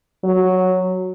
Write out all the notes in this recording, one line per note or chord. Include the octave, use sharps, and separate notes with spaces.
F#3